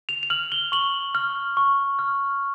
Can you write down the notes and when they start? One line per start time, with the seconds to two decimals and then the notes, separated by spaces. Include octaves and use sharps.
0.09 F7
0.23 F7
0.30 F6 F#7
0.52 G7
0.72 C#6 F#7
1.15 F6
1.57 C#6
1.99 F6